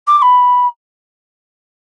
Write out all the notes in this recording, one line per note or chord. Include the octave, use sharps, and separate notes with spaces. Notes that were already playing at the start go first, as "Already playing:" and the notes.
D6
D6
B5